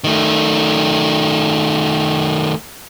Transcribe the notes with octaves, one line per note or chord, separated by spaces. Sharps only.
D#3 A3